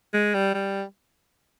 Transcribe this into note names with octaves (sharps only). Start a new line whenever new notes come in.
G#3
G3
G3